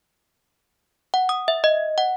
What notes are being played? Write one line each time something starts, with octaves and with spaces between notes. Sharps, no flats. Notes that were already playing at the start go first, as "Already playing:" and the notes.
F#5
D#6
E5
D#5
F#5